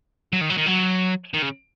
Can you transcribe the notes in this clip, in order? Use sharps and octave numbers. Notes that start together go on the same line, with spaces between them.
F#3
D#3
F#3
D#3
F#3
D#3
C#3